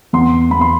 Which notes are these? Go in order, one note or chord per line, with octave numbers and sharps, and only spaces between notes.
E2 C6
E2 B5
C6